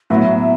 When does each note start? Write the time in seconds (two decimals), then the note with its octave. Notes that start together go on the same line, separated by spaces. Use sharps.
0.10 A2 F#3 B3 E4 E5